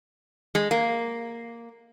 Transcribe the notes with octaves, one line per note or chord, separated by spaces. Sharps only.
G#3
A#3